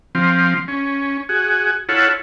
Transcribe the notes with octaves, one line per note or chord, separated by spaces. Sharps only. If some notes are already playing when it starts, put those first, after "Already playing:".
F3 C4
C#4
F#4 G#4
E4 F4 A4 C#5 F#5